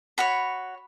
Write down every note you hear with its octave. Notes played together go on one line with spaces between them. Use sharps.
F#4 C#5 B5